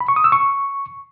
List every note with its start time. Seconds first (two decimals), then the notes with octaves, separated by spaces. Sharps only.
0.01 B5
0.08 C#6
0.16 D#6
0.24 E6
0.32 C#6